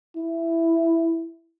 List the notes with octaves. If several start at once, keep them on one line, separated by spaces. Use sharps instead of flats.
E4